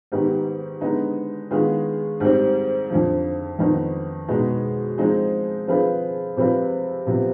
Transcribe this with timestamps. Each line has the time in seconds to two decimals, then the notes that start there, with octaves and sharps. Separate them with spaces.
0.12 G#2 D#3 B3 D#4 G4
0.81 D3 G#3 B3 D#4
1.51 D#3 G#3 B3 F4 G#4
2.20 G#2 G3 C4
2.90 F2 D3 F3
3.59 F2 D#3 B3 D#4
4.28 B2 G#3 B3 D#4 G#4
4.98 F3 G#3 C4 D#4 G#4
5.68 F3 C4 F4 G#4 B4
6.37 C3 F3 C4 F4 B4
7.06 C3 F3 B3